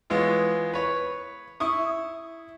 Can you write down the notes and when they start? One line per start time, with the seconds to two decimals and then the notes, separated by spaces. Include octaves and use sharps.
0.10 E3 G#3 B3 F4 C#5
0.73 B4 C#5
1.60 E4 C#6 D#6